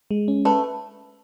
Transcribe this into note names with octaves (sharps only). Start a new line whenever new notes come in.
G#3
C#4
A3 B4